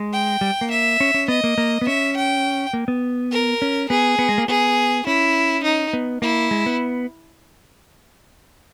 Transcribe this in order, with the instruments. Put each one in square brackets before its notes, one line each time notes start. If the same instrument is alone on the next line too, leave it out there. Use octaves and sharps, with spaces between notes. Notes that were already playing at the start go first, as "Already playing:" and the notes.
Already playing: [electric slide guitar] G#3
[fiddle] G5
[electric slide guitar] G3
A#3
[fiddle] E5
[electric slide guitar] C#4
C#4
[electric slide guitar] B3 [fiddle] D#5
[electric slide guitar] A#3
A#3
B3
[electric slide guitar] C#4 [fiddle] E5
[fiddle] G5
[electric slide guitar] A#3
B3
[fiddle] A#4
[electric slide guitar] C#4
[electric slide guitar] B3 [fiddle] G#4
[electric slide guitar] B3
G#3
A#3
[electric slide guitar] B3 [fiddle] G#4
[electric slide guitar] C#4 [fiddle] E4
[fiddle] D#4
[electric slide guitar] B3
[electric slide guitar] A#3 [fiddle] E4
[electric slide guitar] G#3
B3